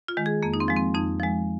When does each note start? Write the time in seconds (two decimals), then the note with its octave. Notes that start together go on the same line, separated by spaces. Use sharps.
0.08 F4
0.17 D#3 G#3
0.26 G#4
0.43 F2 A#3
0.54 D#4
0.60 C4
0.68 F3 G#3
0.77 C4
0.94 F2 D#4
1.20 F3 G#3